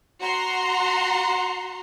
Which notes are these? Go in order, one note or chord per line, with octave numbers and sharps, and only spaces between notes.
F#4 F#5 A#5 C6